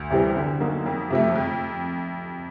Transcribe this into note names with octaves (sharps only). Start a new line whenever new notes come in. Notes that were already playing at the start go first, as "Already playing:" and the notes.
Already playing: D2
C3 E3 G3 C4
D3
F#3 A#3 D#4 F#4
F2
C3 F3 A3
F2